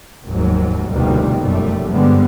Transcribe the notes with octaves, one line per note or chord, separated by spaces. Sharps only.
F1 D#2 G#2 F#3
F1 D2 B2 D#3 G3 A#3
F1 F#2 G3 A3
G2 D3 G3 G#3 B3 C4